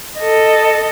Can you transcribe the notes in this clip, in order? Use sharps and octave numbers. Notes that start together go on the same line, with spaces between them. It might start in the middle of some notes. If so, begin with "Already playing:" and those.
A4 D#5